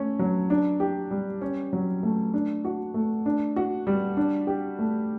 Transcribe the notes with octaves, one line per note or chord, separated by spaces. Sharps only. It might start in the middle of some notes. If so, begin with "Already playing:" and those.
Already playing: A3 C#4
F#3
D4
G4
G3
C#4
F#3
A3
D4
F#4
A3
D4
F#4
G3
D4
G4
A3